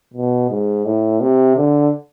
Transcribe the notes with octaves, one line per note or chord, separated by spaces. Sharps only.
B2
G#2
A2
C3
D3